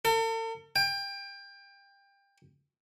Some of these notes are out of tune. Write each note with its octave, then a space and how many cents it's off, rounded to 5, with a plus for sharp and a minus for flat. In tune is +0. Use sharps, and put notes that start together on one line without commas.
A4 +45
G5 +25